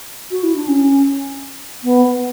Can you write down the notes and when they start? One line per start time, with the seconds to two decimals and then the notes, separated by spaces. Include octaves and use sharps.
0.31 F#4
0.43 E4
0.56 D4
0.68 C#4
1.84 B3